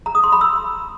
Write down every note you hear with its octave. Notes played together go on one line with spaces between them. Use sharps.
A#5
D#6
C6
B5
E6